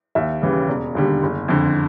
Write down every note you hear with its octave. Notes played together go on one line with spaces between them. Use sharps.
D#2 E5
C#3 E3 G3
E1
D#2 D3 G3
F#1
F2 D3